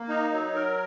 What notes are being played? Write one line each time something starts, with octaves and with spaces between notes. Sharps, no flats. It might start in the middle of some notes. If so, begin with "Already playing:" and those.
Already playing: A#3
D#4
F#3
A#4